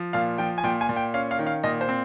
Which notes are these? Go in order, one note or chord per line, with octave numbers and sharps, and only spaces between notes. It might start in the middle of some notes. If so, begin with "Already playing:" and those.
Already playing: F3
A#2 F5
F3 G5
G#5
A#2 G5
G#5
A#2
G5
C#4 F5
F5
D#3
F5
A#2 D#5
C5
C4